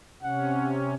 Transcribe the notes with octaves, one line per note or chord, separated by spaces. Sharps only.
C3 C#4 F#5